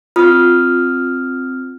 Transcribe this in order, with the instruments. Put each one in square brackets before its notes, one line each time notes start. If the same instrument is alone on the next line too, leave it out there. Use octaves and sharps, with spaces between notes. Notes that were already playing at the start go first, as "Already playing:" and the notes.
[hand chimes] C4 D#6 F6 [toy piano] F4